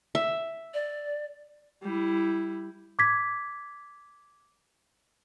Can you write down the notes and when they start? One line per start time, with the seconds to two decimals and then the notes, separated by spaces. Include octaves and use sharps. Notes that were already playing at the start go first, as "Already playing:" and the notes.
0.15 E5
0.74 D5
1.82 G3 E4
2.99 D6 G#6 B6